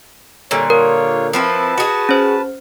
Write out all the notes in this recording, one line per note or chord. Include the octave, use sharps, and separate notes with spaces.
A#2 D3 G3 C#5
F4 A#4 C#5
F3 C4 E4 B4 A5
F#4 G#4
C#4 C5